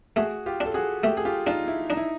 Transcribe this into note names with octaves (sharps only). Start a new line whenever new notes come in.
A3 F#4 G#4
F4 G4
D4
A4
F#4 G#4
A3 G4 A4
G#4
F4 G4
D4 D#4 F4
E4
D4 D#4
E4